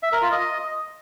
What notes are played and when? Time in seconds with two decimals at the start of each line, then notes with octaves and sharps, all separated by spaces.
0.03 E5
0.12 A#4
0.22 F4
0.32 D#5